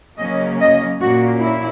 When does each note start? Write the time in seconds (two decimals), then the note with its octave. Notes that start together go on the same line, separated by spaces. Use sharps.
0.18 C#3 F#3 A#3 C#4 D#5
0.60 D#5
1.00 A#2 A#3 C#4 F#4
1.41 E4